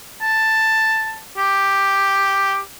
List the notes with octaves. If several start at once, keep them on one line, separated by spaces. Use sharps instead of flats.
A5
G4